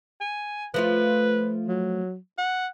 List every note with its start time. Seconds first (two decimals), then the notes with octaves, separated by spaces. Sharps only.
0.21 G#5
0.74 F3 A3 F4 B4
1.68 F#3
2.38 F#5